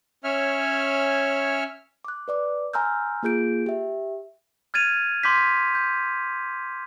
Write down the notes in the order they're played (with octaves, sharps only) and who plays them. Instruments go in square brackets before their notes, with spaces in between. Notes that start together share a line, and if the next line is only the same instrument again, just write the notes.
[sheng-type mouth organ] C#4 C#5 E5 G#5 F6
[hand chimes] D6 F#6
B4 D5 D6
G#5 A#5 C6 E6 F6 G6
A#3 F4 G#4 G6 D7
G4 E5
[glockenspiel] F6 G#6 A6 D#7 F7
C6 D6 G6 B6
G6